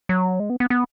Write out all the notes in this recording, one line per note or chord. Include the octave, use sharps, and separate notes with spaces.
F#3
G#3
B3
B3
B3